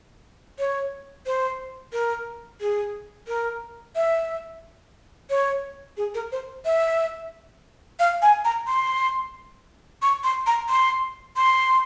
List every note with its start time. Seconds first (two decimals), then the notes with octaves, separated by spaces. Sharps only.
0.59 C#5
1.26 C5
1.93 A#4
2.61 G#4
3.28 A#4
3.96 E5
5.30 C#5
5.97 G#4
6.14 A#4
6.32 C5
6.65 E5
7.99 F5
8.22 G#5
8.45 A#5
8.67 C6
10.02 C#6
10.24 C6
10.47 A#5
10.69 C6
11.37 C6